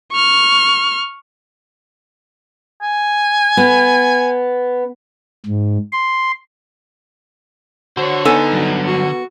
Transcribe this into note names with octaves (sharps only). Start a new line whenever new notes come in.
C#6 F6
G#5
B3
G#2
C6
D3 F#4 C5 C#5
B3 D#4 A4 G#5
G2 F#3
F#4